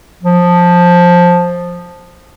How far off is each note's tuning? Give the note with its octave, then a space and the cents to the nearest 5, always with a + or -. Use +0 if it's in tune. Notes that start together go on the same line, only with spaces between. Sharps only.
F3 +10